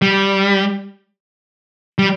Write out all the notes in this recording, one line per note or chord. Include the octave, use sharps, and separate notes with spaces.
G3
G3